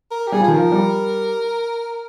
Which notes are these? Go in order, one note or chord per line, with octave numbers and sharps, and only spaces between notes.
A#4
G4
G3 G#4
F3
G#4
D#3
A#4
F3
G3